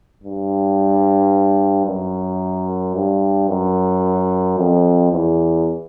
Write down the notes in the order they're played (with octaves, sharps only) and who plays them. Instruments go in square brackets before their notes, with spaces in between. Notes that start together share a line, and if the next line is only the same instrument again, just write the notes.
[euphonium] G2
F#2
G2
F#2
F2
E2